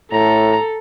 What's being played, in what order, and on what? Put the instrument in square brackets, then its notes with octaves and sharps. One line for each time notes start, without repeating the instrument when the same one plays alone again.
[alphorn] A2 [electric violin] A4 [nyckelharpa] A#5